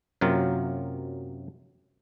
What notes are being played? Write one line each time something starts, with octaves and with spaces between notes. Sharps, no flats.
F#2 C3 F#3 A#3 F4